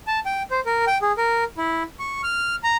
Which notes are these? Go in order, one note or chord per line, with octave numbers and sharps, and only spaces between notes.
A5
G5
C5
A#4
G5
G#4
A#4
E4
C#6
F6
A#5